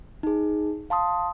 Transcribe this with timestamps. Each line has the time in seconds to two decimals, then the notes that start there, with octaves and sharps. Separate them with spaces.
0.23 D#4 G#4
0.90 F5 A5 C6 D#6